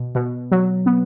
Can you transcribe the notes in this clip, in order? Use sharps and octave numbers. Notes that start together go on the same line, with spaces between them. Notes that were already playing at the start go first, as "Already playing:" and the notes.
Already playing: B2
B2
F#3
B3